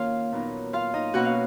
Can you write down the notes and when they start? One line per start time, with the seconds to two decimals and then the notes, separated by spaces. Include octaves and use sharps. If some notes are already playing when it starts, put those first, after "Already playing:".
Already playing: D#3 A#3 C#4 F4 F5
0.32 A#2 F#3 B3 D#4
0.73 F4 F5
0.94 D#4 D#5
1.14 B2 A#3 C#4 F#4 F#5
1.25 F5